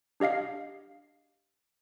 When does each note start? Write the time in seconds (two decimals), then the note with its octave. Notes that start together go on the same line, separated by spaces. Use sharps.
0.20 D4 G4 D#5 F5 C7